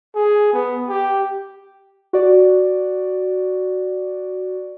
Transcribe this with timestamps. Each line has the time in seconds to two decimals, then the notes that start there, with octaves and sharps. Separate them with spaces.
0.16 G#4
0.53 B3
0.89 G4
2.13 F#4 D5